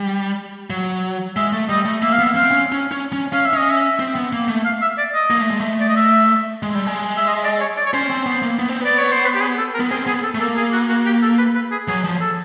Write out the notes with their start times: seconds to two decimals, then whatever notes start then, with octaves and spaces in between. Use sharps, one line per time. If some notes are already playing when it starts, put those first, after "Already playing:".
Already playing: G3
0.70 F#3
1.36 G#3 E5
1.52 A3
1.69 G3 D#5
1.85 A3
2.02 A#3 E5
2.13 F5
2.19 B3 E5
2.35 C4 F5
2.51 C#4
2.72 C#4
2.92 C#4
3.13 C#4
3.33 C#4 F5
3.46 E5
3.53 C#4 D#5
3.70 E5
3.99 C4
4.16 B3
4.33 A#3
4.48 A3
4.65 F5
4.82 E5
4.98 D5
5.14 D#5
5.30 A#3
5.41 A3
5.51 G#3
5.60 A3
5.81 D5
5.89 D#5
5.96 E5
6.63 G#3
6.75 G3
6.87 G#3
7.17 E5
7.28 D#5
7.44 D5
7.61 C#5
7.77 D5
7.86 C#5
7.93 C#4 C5
8.10 C4
8.26 B3
8.42 A#3
8.59 B3
8.69 C4
8.81 B3 D5
8.99 C#5
9.12 C5
9.25 B4
9.35 G4
9.41 G#4
9.58 A4
9.74 A#4
9.80 B3
9.91 C4 G#4
10.06 B3 G#4
10.23 A4
10.35 A3
10.40 A#3 A4
10.57 G#4
10.73 F#4
10.89 F#4
11.06 G4
11.22 A4
11.38 B4
11.55 B4
11.71 G#4
11.87 F#3 G#4
12.04 F3
12.21 A4